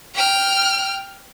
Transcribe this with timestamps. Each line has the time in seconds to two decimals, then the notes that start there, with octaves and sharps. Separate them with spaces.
0.15 G5 F6